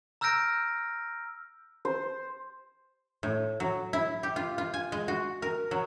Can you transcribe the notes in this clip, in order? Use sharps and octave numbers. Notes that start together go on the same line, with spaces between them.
A#5 E6 F6 G6 A#6 D7
C5
A2
F#3
E4
G4
F4
F4
G#5
G#3
F#4
A#4
F#3